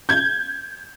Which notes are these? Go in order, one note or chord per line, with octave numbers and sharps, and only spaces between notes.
G6 G#6